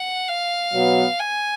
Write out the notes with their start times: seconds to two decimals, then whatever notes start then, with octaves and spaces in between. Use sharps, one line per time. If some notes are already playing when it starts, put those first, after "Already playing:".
Already playing: F#5
0.29 F5
0.73 B2 F#3 B3
1.20 G#5